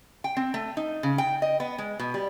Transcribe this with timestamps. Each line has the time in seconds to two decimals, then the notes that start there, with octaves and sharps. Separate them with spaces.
0.24 G5
0.37 C4
0.54 A3
0.77 D#4
1.03 C#3
1.18 G5
1.42 D#5
1.60 B3
1.78 G#3
1.99 B2
2.14 G3